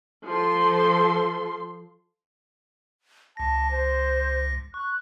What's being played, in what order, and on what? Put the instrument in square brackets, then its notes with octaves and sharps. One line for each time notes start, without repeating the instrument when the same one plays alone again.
[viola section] F3 A4 C6
[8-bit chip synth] C#2 A#6 [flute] A5
[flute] C5
[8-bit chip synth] C#6 [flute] F#6